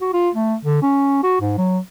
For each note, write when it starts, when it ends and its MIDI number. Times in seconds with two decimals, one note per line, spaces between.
0.01 0.10 66
0.13 0.29 65
0.35 0.55 57
0.64 0.81 50
0.82 1.23 61
1.23 1.37 66
1.40 1.56 44
1.58 1.78 54